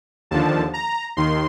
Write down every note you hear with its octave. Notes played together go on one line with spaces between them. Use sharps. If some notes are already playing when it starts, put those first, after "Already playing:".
D#2 D3 F3 A5
A#5
D#2 D#3 C6